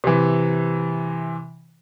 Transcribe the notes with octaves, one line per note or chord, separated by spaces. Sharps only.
C3 E3